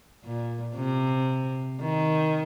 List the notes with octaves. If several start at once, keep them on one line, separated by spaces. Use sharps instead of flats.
A#2
C3
D#3